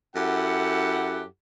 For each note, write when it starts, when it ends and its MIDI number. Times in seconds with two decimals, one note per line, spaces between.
0.16 1.24 42
0.16 1.24 64
0.16 1.24 67
0.16 1.24 69
0.16 1.24 78